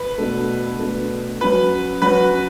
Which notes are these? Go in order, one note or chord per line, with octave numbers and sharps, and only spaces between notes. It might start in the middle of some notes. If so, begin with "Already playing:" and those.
Already playing: B4
B2 A3 D4 A4
B2 A3 D4 A4
F#3 C#4 F#4 B4
F#3 C#4 F#4 B4